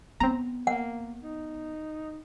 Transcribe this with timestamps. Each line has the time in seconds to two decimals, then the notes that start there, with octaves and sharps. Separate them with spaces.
0.20 B3 C4 A#5
0.67 A#3 F#5
1.23 D#4